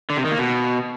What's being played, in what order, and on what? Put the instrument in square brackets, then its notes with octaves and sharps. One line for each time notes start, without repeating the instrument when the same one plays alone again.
[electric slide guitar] D3
C3
D#3
A#3
B2